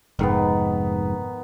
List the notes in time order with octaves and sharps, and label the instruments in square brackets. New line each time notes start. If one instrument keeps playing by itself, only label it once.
[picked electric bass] F1 G#2 [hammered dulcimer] D#3 B3